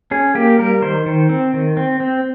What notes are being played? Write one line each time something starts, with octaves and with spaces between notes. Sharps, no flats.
C#4 G#4
A#3 G4
G3 A#4
D#3 C5
D#3
C4
D#3
C4
C4